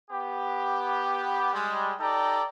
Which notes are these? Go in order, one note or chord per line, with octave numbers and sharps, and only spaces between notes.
B3 G4
G3 G#3
D#4 G4 A4 D5 A#5